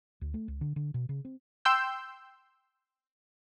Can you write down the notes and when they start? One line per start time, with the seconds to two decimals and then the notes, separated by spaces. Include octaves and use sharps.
0.21 D2
0.34 A3
0.48 C#2
0.61 D3
0.76 D3
0.94 B2
1.09 C#3
1.25 C4
1.65 G5 C6 E6 G6